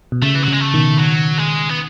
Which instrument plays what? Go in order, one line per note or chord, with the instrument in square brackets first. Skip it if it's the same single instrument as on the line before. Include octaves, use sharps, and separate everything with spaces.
[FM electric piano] B2
[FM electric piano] C#3 [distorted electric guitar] A3
[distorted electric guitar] E3
[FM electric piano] C#3 [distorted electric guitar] F#3
[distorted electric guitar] G#3
A3
[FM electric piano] B2 D#3
[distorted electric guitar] F#3
G#3
B3